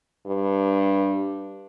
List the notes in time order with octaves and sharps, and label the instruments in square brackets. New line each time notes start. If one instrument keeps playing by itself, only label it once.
[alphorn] G2